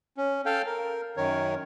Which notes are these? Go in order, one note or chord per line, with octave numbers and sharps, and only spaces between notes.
C#4
A4 F5 G5
A#4
F#2 D#3 A#4 C#5